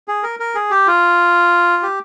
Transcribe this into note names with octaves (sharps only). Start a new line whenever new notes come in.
G#4
A#4
A#4
G#4
G4
F4
G4